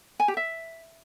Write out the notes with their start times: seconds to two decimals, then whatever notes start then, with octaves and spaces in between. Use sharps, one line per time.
0.20 G#5
0.28 G4
0.37 E5